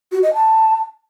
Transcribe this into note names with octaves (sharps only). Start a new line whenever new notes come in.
F#4
D#5
A5